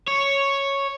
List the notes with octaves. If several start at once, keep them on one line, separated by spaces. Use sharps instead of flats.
C#5